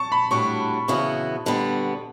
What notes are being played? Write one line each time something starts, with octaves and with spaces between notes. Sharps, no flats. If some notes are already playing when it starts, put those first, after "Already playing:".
Already playing: A5 C#6
B5
A2 G3 D4 F#4 C#6
C#3 E3 B3 F#4
D3 G3 B3